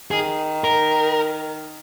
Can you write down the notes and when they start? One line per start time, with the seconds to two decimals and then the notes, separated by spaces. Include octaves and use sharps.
0.11 D#3 G#4
0.64 A#4